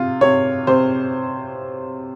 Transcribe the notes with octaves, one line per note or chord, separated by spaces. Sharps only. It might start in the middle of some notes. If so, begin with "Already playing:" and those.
Already playing: C3 F4
C3 C#5
C3 C5